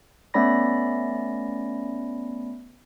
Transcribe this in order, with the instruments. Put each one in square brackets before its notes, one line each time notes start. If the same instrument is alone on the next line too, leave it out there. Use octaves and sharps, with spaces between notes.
[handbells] A3 B3 C#4 D5 B5 A#6